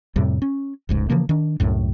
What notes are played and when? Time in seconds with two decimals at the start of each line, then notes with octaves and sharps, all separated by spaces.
0.16 F2 A2 C3 G3
0.42 C#4
0.89 F1 C#2 G#2
1.10 C#3 E3 F3 A#3
1.29 D#3 D4
1.60 C2 F#2 A2